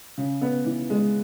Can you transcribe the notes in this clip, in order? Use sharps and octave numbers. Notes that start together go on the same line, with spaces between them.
C#3
B3
E3
G#3